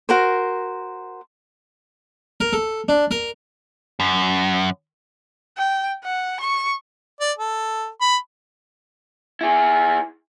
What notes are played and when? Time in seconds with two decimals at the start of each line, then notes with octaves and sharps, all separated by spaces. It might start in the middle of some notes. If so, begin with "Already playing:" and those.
0.09 F#4 A#4 C5
2.40 A#4
2.53 A4
2.88 D4
3.11 A#4
4.00 F#2
5.57 G5
6.04 F#5
6.40 C#6
7.21 D5
7.38 A4
8.01 B5
9.41 E4 G#4